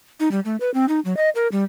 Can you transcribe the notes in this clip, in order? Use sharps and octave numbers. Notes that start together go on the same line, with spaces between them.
D#4
G3
A3
B4
C4
D#4
F#3
D#5
A#4
G3